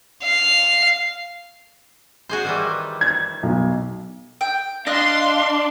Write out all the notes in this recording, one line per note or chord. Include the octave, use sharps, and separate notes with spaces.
F5
F#4 G#4 C5
D#3 E3 G3
G#6
B1
G5
D4 D#5 F5 C6 F#6